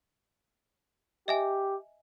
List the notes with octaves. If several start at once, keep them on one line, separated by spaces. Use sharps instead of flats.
G4 D#5 E5 G#5